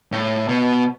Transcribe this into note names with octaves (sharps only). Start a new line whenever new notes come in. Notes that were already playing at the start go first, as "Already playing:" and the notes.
A2
B2